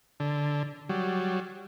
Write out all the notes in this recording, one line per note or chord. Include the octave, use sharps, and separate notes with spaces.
D3
F#3 G3